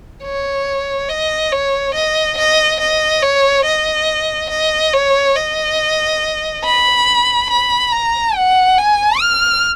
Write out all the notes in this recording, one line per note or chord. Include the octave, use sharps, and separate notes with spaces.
C#5
D#5
C#5
D#5
D#5
D#5
C#5
D#5
D#5
C#5
D#5
B5
B5
A#5
F#5
G#5
F6